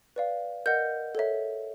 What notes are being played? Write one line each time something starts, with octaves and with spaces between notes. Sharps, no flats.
B4 D5 F5
A#4 D#5 F#5 G6
A4 C#5 E5